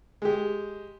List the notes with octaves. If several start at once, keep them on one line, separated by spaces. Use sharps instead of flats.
G#3 G4